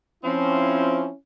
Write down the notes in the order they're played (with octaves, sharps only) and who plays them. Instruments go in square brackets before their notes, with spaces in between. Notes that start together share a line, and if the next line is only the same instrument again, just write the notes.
[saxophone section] F3 C4 [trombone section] C#4 E4